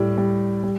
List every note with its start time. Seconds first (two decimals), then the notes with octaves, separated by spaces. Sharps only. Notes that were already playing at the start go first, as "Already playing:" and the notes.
Already playing: A2 G3
0.18 G3
0.63 G3